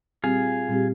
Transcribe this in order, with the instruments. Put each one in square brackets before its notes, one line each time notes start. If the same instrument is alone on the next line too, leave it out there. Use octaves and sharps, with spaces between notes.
[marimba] A#2 G3 C4 G4 [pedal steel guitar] F4 G#4
[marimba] A#2 G3 C4 G4